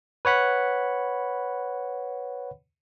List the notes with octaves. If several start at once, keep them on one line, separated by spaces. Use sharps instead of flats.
B4 C#5 F#5 B5